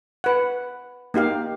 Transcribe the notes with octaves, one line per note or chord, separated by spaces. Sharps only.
B4 F#5
A#3 D#4 G4 F5